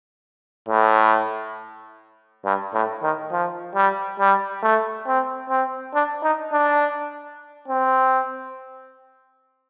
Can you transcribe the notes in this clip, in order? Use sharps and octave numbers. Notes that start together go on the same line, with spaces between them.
A2
G2
A2
D#3
F3
G3
G3
A3
C4
C4
D4
D#4
D4
C4